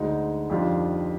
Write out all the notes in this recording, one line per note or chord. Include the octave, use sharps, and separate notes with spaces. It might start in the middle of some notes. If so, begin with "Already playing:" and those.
Already playing: D2 D3 G#3 D#4
F2 D#3 G3 D4 F4